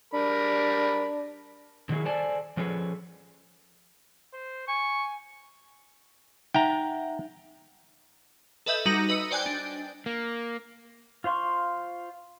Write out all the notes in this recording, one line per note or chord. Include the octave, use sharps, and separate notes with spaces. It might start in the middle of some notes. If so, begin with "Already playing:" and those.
G3 D4 A#4 B5
D3 D#3 F#3 C#4 E4 G#4
A4 C5 D5 G#5 A5
F3 C#4 G#4 A4 B4 C#5
C5
G#5 C#6
D#4 E5 F#5 G5 A#5
A4 B4 D#5 E5 G6
G3 D#4 F#4 A#5 D#6 F#7
B4 D#5 E6 C#7
C5 D5 G5 G#5 F#6 G6
D4
A#3
F4 C5 F5 C6 C#6